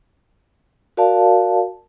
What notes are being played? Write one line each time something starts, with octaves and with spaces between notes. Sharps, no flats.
F#4 A#4 D5 F5 A5